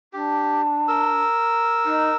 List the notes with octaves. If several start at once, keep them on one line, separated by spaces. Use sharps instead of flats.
D4 G4
A#4 E6
D#4